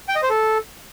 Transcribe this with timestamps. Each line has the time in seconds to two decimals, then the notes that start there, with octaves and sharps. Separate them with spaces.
0.09 G5
0.16 D#5
0.23 C5
0.30 A4